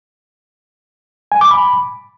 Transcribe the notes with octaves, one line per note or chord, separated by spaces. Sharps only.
G#5
D6
B5